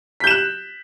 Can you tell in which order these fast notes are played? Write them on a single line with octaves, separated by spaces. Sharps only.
B6 G6 E7 F#6